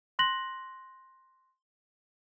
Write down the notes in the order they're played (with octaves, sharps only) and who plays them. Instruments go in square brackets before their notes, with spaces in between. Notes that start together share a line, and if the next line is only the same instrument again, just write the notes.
[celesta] C6 F#6 A#6 F#7